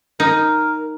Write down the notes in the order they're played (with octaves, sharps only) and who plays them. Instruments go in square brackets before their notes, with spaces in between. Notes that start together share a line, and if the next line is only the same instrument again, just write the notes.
[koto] D#4 [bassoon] A#4